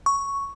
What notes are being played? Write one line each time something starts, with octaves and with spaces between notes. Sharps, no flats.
C#6